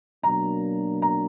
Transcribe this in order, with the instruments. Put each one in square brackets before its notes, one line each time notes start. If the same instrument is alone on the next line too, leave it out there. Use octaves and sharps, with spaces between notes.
[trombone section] B2 F#3 A#3 D4 [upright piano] A#5
[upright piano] A#5